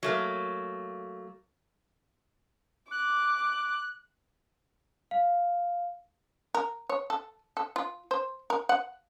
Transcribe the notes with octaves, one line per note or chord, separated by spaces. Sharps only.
F#3 A3 A#3
D6 F#6
F5
A#4
C#5
A4
A4
F4
C5
A#4
F#5